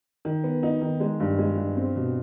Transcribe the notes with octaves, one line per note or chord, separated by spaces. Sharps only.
D#3
B3
D#4
D#3
G#3
G2
G#3
G2
C4
B2